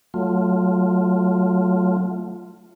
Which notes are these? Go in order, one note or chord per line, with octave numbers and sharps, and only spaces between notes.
F#3 A3 F4